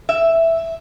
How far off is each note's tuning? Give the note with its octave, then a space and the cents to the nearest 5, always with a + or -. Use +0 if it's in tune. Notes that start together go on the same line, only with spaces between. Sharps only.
E5 +0